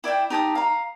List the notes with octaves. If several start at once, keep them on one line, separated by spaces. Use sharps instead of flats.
E4 D5 E5 G5
D#4 G4 A5 D#6
F5 A#5